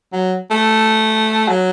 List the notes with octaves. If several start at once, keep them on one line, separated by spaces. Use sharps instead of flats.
F#3
A3
F#3